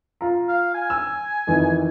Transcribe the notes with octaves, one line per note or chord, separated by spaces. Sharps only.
F4 A#5
F5
G#5
E6
F2 D#3 E3